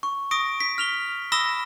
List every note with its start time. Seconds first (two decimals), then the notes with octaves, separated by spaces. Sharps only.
0.03 C#6
0.31 C#6 D#6 A#6 D7
0.60 B6
0.78 F6 F7 G7
1.32 B5 D#6 E6 A#6 E7 G7